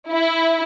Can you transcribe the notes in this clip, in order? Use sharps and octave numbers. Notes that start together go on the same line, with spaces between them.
E4